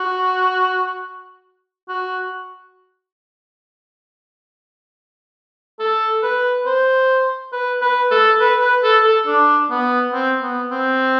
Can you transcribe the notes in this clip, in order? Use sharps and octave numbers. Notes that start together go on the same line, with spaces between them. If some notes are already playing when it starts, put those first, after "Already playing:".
Already playing: F#4
F#4
A4
B4
C5
B4
B4
A4
B4
B4
A4
A4
D4
B3
C4
B3
C4